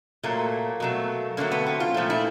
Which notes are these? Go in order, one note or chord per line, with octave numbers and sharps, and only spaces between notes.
A#2 F#3 A3 A#3
B2 F#3 A3
D3 F#3 A3 A#3
B3
C4
F4
A#2 F3 A3
E4